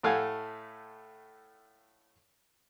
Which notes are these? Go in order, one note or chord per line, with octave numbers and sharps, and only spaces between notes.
A2 A3 F5 F#5 G#5